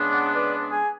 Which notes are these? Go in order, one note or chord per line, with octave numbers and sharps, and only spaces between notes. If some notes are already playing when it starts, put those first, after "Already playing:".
Already playing: C#3 G#3 B3 D4
D5 F#5
B4 D5
G#4